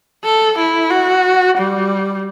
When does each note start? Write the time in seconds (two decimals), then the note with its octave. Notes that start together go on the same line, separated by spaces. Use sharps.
0.24 A4
0.58 E4
0.91 F#4
1.57 G3